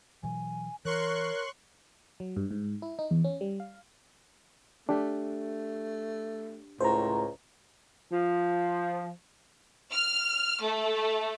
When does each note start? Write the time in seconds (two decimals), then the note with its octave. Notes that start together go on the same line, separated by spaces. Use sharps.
0.23 B2 E3 F#3 G#5
0.85 E3 A#4 C#5 C6 C#6 F#6
2.20 F#3
2.37 G2
2.51 G#2
2.82 E4
2.99 D#4
3.11 E2
3.24 C#4
3.41 G3
3.60 F5
4.89 A3 D4 G4
6.81 C#2 A2 C5 A#5
8.11 F3
9.92 F6
10.62 A3